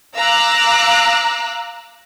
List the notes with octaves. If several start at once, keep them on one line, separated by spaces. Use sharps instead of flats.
F5 A#5 D6 E6 F#6